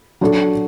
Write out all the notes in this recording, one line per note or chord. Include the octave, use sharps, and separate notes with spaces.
F#3 D4 F#4 A4